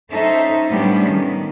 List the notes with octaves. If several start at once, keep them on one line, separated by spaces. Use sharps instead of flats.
C#4 D#4 A4 C5 E5
A2 G3 B3 C#4 D4
D#3